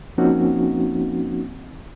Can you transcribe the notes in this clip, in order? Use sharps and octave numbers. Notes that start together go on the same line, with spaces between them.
F3 A#3 C4 C#4 D#4 F#4